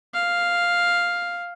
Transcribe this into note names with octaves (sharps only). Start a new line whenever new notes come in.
F5